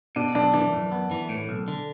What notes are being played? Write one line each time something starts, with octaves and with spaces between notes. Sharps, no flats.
B2 D4
B1 D4
E3 D4
F#2
B3
E3
A2
B1
D3